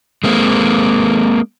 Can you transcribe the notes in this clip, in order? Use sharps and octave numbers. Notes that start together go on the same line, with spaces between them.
G#3 A#3 C4